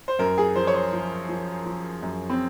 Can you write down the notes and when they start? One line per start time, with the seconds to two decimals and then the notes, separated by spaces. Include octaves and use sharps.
0.08 C5
0.19 F#2 A#4
0.38 G#4
0.56 F3 C5
0.67 C#5
0.74 C5
0.92 F3
1.29 F3
1.65 F3
2.02 F#2
2.29 C4